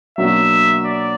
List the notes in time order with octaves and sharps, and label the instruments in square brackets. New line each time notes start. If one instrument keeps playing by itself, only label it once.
[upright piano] B2 F#3 A#3 D4 F#4 [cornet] E5
[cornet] D5